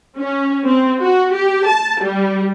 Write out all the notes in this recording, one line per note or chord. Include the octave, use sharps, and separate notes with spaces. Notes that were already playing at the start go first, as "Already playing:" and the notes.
C#4
C4
F#4
G4
A5
G3